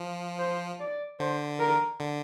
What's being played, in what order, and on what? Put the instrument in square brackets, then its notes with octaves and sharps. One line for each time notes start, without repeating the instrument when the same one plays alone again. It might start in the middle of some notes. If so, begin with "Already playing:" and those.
Already playing: [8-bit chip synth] F3
[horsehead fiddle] C5
D5
[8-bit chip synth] D3 [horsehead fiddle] C5
[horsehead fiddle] A#4
[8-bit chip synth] D3